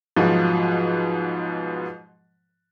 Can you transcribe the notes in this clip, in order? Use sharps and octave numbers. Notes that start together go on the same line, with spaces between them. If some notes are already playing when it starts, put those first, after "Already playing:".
G#2 B2 F3 F#3